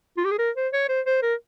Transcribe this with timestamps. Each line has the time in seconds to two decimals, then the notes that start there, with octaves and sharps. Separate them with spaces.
0.17 F4
0.25 G4
0.31 G#4
0.38 A#4
0.56 C5
0.73 C#5
0.89 C5
1.06 C5
1.22 A#4